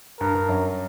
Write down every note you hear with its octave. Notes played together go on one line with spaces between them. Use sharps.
G2 A#4
G2
F#2